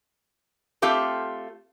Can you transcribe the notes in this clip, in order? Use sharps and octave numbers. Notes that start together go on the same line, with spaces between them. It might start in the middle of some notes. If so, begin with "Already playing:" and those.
A3 C4 F4 G4 A4